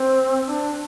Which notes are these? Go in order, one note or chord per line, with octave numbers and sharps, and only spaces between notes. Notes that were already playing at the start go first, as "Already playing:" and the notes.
Already playing: C4
D4